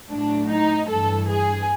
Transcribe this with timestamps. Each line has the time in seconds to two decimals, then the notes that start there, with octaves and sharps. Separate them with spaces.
0.11 A2 F#3 D4
0.50 D#4
0.90 G2 E3 A4
1.29 G#4